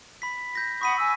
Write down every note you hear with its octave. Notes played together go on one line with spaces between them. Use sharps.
B5 B6
G6 A#6 B6
F#5 B5 C#6 D#6 B6 D#7
G#5 E6